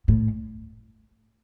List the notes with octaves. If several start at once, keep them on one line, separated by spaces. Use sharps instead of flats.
A2